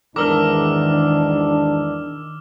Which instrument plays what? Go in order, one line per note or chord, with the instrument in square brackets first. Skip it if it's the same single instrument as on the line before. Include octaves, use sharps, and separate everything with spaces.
[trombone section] E2 G#2 D4 [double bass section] D#3 [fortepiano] A#4 [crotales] D6 E6 F6